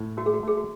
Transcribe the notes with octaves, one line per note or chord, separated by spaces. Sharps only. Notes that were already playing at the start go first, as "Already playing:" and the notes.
Already playing: A2
A3 F#4
G#4
F#4
A3 G#4
F#4